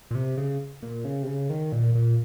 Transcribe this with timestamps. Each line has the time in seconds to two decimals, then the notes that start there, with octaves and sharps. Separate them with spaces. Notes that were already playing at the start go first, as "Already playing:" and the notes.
0.11 A#2
0.15 C3
0.37 C#3
0.82 A#2
1.05 C#3
1.23 C3
1.28 C#3
1.50 D#3
1.72 A#2
1.95 A#2